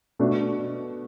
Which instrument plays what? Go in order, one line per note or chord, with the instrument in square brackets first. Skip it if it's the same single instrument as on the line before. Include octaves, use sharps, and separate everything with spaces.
[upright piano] B2 A3 D4 F#4